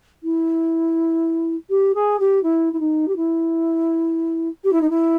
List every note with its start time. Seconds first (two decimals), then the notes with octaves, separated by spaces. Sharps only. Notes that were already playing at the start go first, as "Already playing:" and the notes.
0.23 E4
1.70 G4
1.95 G#4
2.20 G4
2.43 E4
2.73 E4
2.80 D#4
3.08 G4
3.16 E4
4.64 G4
4.73 E4
4.81 D#4
4.90 E4